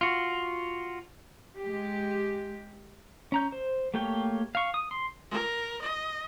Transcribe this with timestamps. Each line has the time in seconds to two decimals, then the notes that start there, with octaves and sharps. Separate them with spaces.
0.01 F4 F#4
1.57 G#3 G4
3.32 C#4 A#5 G6
3.52 C5
3.94 A3 A#3 G4 C#5 G5
4.55 F5 C#6
4.74 D#6
4.91 C6
5.31 A#4
5.81 D#5